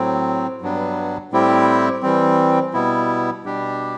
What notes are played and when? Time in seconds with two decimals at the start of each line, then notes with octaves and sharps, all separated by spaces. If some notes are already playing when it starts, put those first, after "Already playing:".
Already playing: A2 F#3 C4
0.61 G2 F#3 B3 D4
1.32 A2 G3 C4 E4 G4
2.03 E3 G3 C4
2.73 B2 G3 B3 E4
3.45 B2 G3 D4 G4